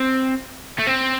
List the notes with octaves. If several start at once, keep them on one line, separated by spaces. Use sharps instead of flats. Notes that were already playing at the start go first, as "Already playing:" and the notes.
Already playing: C4
A3
C4